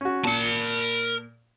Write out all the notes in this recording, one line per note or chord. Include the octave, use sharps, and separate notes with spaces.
C#4 F#4
A#2 A#4 A5